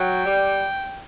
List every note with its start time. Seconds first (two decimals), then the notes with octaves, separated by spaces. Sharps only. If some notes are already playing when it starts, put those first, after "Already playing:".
Already playing: F#3 G5
0.26 G3